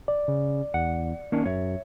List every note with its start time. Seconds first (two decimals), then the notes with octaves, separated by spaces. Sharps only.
0.08 D5
0.28 C#3
0.74 E2 F#5
1.32 D#3 A#3 C#4 D4
1.46 F#2 C#5 E5